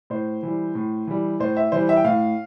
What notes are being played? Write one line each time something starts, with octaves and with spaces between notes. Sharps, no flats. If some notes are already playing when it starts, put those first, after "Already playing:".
A2 C5
E3 G3
A2
E3 G3
A2 C5
E5
E3 G3 C5
E5
G5
A2 F5